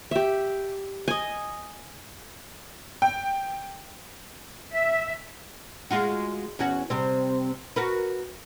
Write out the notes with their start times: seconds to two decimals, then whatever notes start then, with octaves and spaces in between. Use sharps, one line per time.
0.11 G4 E5
1.08 D#5 G#5
3.02 G5
4.73 E5
5.91 G#3 F4 F#4
6.59 E2 C#4 F#4
6.90 C3 G3 C4
7.76 F#4 A#4 B4